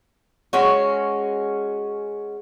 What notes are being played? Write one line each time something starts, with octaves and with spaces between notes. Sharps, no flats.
G#3 C#4 F#4